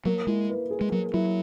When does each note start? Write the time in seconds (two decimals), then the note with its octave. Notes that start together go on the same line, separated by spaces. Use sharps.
0.05 F#3 A#3
0.27 G#3 E4
0.50 B4
0.70 G#4
0.81 G#3
0.92 F#3 A#3
1.13 F#3 E4